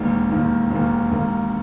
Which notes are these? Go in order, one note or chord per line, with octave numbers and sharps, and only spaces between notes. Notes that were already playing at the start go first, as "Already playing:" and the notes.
Already playing: E1 D#2 D#3 A#3
E1 D#2 D#3 A#3
E1 D#2 D#3 A#3
E1 D#2 D#3 A#3